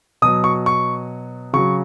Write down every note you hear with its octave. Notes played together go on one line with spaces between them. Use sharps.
B2 F#3 D#6
C#6
C#6
C#3 F#3 C#6